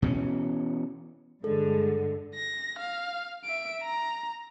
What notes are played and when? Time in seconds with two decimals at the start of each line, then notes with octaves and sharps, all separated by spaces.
0.02 B2 E3 C4 C#4
1.44 G2 D3 G#3 A4
2.35 A#6
2.79 F5
3.44 E5 D7
3.82 A#5